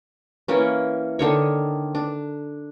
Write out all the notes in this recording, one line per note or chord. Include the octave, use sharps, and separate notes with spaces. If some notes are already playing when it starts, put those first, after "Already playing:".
E3 A#3 C#4
D3 D#3 C#5
D4